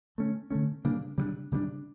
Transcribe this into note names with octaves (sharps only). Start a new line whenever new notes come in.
D3 A3 C#4
D3 A3 C#4
C#3 G3 A#3 D4
C#3 G3 A#3 D4
C#3 G3 A#3 D4